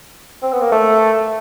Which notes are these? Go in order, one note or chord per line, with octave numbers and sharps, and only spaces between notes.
C4
B3
A#3
A3